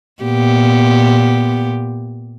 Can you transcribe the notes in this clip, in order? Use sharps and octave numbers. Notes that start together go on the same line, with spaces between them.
A#2 B3 G4